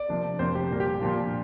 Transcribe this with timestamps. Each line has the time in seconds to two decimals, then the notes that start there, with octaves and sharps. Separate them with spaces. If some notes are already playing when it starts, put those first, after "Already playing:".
Already playing: D5
0.09 C3 F3 A#3 D4
0.39 F2 C3 A#3 C5
0.55 G4
0.70 A#2 G3 A#3
0.80 G4
1.00 A#2 F3 A#3 D4 F4